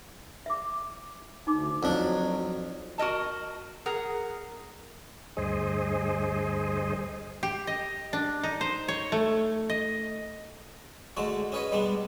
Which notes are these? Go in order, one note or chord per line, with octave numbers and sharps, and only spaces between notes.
E5 D6
D2 D#4 D6
F2 F#3 D4
F#4 A#4 D#5 A5
G#4 A#4 F#5
D2 G2 G#4 C5 D#5
G4
D#5
D4
D#4
C5
C#5
A3
D#5
D2 D3 G#3 A3 F#4
C#4 G#4 B4 C#5 D#5
G3 G#3 B3 D4